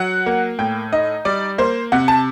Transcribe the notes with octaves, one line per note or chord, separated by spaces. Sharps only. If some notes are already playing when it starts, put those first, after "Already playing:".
Already playing: F#3 F#5
A#3
A2 G5
D#4 D#5
G3 D5
A#3 C5
C3 F#5
A5